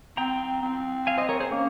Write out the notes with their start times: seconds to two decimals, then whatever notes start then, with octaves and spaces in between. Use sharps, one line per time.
0.17 C4 G5 A#5
0.62 C4
1.07 F5 G#5
1.17 C5 D#5
1.29 A#4 C#5
1.40 G#4 C5
1.51 A#3 C#4